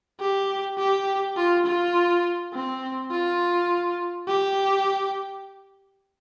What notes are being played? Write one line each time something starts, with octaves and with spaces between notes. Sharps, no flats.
G4
G4
F4
F4
C4
F4
G4